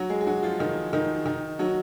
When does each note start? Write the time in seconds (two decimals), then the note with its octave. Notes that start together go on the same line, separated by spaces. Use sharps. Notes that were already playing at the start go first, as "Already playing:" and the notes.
Already playing: F#3 F#4
0.09 G#3 G#4
0.21 G#4
0.27 F#3 F#4
0.43 F3 F4
0.59 D#3 D#4
0.93 D#3 D#4
1.26 D#3 D#4
1.59 F#3 F#4